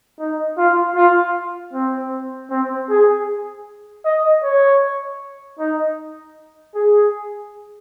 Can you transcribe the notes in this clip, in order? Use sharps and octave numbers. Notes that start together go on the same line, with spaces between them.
D#4
F4
F4
C4
C4
G#4
D#5
C#5
D#4
G#4